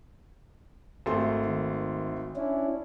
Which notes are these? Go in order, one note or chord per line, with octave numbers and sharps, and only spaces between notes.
G#1 A3 C6
D#3
C#4 D4 E4